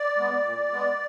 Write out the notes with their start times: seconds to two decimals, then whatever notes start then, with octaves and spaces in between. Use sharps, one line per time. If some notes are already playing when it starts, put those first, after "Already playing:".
Already playing: D5
0.17 G#3 B3
0.45 A#2
0.72 G#3 B3